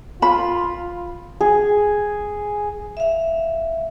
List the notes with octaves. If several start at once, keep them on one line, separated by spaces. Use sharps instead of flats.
F4 B5
G#4
E5 F5